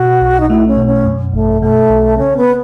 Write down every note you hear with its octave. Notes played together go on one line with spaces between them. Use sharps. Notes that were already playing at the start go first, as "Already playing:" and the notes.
Already playing: B2 F#4
B1
D#4
A3 E4
C#4
B2
C#4
F#2
G#1 A3
B2 A3
B1
C#3 C#4
B3